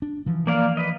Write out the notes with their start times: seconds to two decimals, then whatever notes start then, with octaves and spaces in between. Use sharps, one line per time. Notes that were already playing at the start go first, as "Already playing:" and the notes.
0.02 D4
0.26 E3 F3
0.47 A#3 D5 F5
0.77 B4 D#5